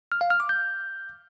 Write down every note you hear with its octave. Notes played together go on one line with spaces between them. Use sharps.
F6
F5
F6
D6
G6